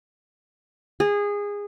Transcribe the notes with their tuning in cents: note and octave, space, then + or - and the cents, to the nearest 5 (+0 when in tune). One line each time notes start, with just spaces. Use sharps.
G#4 -20